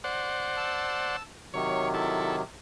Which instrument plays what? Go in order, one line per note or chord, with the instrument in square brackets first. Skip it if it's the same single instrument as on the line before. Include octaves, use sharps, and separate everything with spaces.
[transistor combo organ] C5 D5 F#5
[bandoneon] A5 E6
[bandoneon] C3 D#3 F#3 [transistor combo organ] C#5
[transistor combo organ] E4 A4